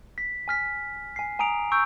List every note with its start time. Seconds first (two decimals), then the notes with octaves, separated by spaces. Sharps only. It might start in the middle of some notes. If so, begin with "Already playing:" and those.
0.18 B6
0.48 G#5 F6 B6
1.16 G#5 C7
1.39 G#5 A#5 D#6 D7 F7
1.72 C#6 E6 G6 D7